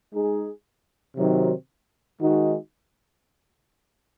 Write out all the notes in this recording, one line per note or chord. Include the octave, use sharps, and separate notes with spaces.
G#3 D#4 G#4
C3 D#3 F#3 C4 D#4
D#3 G#3 D#4 F#4